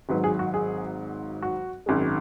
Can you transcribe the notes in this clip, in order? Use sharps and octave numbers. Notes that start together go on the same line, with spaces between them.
G#1 G#2 F#3 B4
G#4
F#4
G#4
F#4
G#1 F#2 D#3 G#3